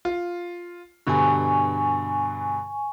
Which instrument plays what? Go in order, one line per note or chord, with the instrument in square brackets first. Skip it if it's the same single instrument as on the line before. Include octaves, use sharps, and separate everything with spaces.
[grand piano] F4
[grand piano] G2 B2 D3 [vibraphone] G#5 C#6